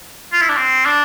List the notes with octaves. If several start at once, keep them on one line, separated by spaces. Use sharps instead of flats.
F4
E4
D4
C4
D4